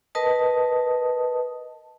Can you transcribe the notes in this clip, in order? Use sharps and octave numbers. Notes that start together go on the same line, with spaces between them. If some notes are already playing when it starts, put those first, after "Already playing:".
A#4 B4 D#5 A5 D#6